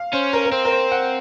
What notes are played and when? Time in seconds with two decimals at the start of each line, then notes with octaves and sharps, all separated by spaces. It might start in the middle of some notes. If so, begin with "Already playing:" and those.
Already playing: F5
0.13 C#4 C5
0.33 A#4
0.45 A#4
0.52 C4 C5
0.65 A#4
0.71 C5
0.92 F#5